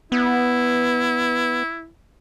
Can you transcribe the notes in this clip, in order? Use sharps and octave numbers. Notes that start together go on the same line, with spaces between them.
B3 E4